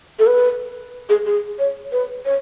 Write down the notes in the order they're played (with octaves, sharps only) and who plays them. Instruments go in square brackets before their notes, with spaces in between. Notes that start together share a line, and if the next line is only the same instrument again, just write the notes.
[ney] A4
B4
G#4
G#4
C#5
B4
C#5